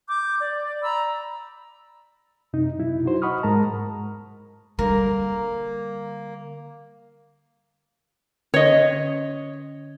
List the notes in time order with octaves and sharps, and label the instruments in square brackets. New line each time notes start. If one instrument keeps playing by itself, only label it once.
[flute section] D6 G6
D5
A#5 B5 E6
[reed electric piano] F#2 C3 D#4
B2 F#3 E4
D#4 F#4 C5
D#5 F#5 B5 C#6 D#6 F6
G#2 G#3 A#4 A5 A#5
[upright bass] D3 G3 [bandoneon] A#3 [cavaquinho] A#4
[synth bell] D3 C#4 [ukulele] C#5 D#5